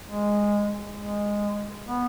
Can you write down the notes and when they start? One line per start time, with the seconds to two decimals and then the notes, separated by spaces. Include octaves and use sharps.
0.06 G#3
0.97 G#3
1.87 B3